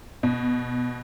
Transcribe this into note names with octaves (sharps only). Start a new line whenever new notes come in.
B2